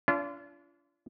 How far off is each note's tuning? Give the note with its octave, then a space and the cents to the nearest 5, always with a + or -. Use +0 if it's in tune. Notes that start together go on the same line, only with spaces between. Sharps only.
D4 -40 F4 -30 E5 +30